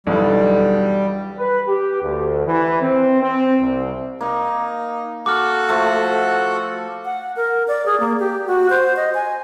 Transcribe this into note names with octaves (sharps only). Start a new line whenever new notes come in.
B1 E2 B2 D3 G3
B4
G4
D2
E3
C4
C4
C2
A#3 D#4
F#4 A4 F#5 D6 F6
F3 A3
F#5
A#4
D5
G#4
A#3
G4
F#4
C5
D#5
G#5